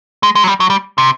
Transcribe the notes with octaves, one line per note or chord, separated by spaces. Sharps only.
G#3
G#3
F#3
G3
F#3
G3
C3